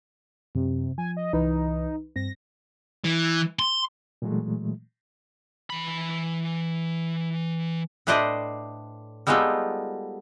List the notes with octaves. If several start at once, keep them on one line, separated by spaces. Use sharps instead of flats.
F#2 C3
F3 G#5
D#5
C2 E3 D#4 B4
G2 C4 A#6
E3
C6
A#2 E3 F#3 G#3 A3
E3 B5
A2 D4 B4 C5 D5 D#5
G3 G#3 B3 D#4 F4 A4